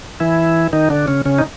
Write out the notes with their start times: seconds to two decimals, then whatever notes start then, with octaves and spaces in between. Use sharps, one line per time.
0.20 E3 E4
0.73 D#3 D#4
0.90 D3 D4
1.08 C#3 C#4
1.25 C#3 C#4
1.38 D#4